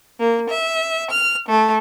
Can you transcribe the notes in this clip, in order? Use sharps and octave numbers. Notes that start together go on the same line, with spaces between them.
A#3
E5
F6
A3